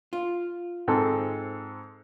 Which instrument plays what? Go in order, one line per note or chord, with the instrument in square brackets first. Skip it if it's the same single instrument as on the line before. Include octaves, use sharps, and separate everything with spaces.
[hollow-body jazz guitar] F4
[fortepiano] G#2 C4 A4